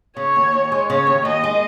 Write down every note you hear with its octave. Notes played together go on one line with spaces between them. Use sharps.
C#3 C#5
D#2
D#2
G#3
C#3 C#5
D#2
D#2 D#5
G#3